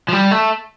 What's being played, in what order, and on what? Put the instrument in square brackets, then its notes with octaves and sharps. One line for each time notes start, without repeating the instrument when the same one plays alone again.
[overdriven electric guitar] F3
G3
A3